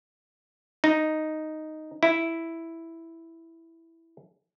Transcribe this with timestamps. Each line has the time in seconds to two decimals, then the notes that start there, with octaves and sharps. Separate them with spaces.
0.84 D#4
2.03 E4